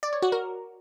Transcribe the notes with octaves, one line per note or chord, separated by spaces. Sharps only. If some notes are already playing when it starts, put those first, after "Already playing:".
D5
C#5
F#4
A#4